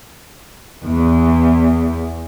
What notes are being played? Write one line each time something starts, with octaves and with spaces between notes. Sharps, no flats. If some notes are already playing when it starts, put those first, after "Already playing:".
E2